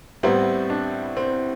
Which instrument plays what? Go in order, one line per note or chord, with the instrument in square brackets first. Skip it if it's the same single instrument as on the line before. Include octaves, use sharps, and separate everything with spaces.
[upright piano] A2 G3 B3 E4 [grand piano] C4
[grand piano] D4
C4